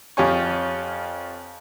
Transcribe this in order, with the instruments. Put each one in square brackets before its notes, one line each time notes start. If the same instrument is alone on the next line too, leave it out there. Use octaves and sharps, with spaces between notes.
[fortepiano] F2 F4 G4 C#5 G#5 C#6